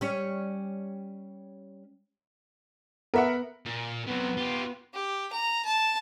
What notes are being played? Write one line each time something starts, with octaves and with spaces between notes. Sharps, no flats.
G3 C#4 C#5
B3 A#4 E5 F#5
A#2
C3 F#3 B3
F4 G4
G4
A#5
A5